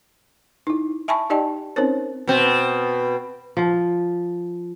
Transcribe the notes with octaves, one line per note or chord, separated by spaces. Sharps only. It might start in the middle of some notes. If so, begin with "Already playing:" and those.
D#4 E4
E5 G#5 A5 B5 C#6
D#4 G4 D5 D#5 G5 A5
C4 C#4 D#4 A#4 C5 C#5
B2 C4
F3